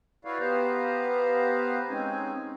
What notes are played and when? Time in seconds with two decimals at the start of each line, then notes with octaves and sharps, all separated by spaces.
0.25 E4 F#4 B4 C#5 D5 F5
0.40 B3 G4 B4 C5 F5 A#5
1.89 G#3 C4 C#4 D#4 G#5